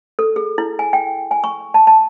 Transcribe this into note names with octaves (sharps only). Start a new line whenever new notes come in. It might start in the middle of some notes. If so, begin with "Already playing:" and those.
A4
G#4
E4
G#5
G5
G#5
C#6
A5
A5